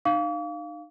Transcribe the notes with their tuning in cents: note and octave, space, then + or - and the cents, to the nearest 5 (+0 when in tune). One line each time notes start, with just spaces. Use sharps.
D#4 -35 F5 +0 D6 -45